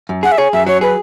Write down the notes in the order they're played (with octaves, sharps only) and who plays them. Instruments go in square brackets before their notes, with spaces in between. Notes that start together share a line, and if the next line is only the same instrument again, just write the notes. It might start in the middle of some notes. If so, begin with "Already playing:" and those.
[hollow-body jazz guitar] F#2
[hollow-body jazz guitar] G#4 [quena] F#5
[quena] E5
[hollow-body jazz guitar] G#4 [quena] C#5
[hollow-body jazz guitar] F#2 [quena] E5
[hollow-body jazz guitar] F#3 [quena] C#5
[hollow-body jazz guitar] G#4 [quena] B4